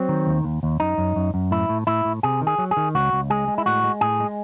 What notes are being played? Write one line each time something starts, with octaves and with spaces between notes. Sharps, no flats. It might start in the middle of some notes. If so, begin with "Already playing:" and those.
Already playing: F#3 C4
D#3
D#2
D#2
D#2
F#2 D#4
F#2
F#2
F#2
A2 E4
A2
A2 E4
A2
C3 G#4
D#3
G#4
F#3
G#4
D#3
C#2 F#4
C#2
G#3 G#4
G#3
E4
A2 F#4
G#3
A2 G#4
G#3